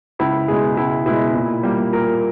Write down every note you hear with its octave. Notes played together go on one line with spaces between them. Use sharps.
C#2 E4
B2 G#3 G#4
C#2 E4
B2 G#3 E4
A#2 E4
G3 A#3
A#2 A#4